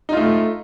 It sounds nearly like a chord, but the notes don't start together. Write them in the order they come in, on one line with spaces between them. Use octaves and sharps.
D#4 F4 A3